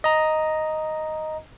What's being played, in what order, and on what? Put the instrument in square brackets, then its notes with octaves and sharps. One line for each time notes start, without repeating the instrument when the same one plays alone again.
[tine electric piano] D#5 A#5